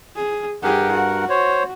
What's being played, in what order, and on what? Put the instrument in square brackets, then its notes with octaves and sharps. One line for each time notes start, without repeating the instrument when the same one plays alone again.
[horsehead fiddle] G#4
[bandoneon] G2 A#4 F#5 [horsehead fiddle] G4 G#4
[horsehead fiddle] F#4
[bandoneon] C5 C#5